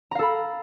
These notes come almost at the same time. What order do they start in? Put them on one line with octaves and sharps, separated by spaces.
A#5 F5 A4 B5